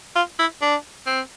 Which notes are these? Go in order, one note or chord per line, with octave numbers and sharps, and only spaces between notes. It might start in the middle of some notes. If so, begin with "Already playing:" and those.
F4
E4
D4
C4